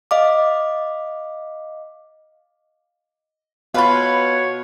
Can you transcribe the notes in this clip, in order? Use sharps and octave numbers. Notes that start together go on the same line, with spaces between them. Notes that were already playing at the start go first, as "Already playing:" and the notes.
D#5 F5 D6
B2 F4 B4 C#5 F5 B5